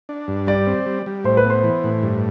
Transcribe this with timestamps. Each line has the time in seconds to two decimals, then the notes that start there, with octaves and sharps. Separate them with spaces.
0.09 D4
0.28 G2
0.47 G3 D5
0.67 C4
0.86 G3
1.06 G3
1.25 A2 C5
1.37 B4
1.45 B3
1.50 C5
1.63 E3
1.84 A2
2.03 G2